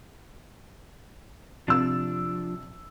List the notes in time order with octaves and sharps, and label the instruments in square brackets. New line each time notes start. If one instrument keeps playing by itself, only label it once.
[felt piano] C3 E6 [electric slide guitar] F3 D4